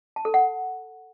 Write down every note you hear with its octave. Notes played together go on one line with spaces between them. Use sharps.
A5
A4
F#5